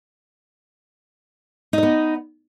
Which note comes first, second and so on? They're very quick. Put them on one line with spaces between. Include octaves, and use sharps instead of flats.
D#4 D#5 B3